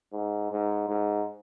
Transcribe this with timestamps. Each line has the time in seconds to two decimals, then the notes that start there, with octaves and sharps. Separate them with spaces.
0.12 G#2
0.51 G#2
0.88 G#2